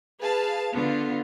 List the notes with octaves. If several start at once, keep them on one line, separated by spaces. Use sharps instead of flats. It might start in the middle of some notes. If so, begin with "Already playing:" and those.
G#4 B4 F5 A5
D3 B3 F4